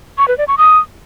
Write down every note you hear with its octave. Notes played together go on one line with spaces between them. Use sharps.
C#6
B4
D5
C#6
D#6